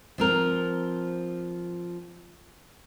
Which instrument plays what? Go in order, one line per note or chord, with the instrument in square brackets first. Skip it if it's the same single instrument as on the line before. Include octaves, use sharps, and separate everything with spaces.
[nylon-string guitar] F3 C4 A#4